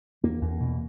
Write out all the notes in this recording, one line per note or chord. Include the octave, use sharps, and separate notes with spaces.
E2 A#3
E2
B2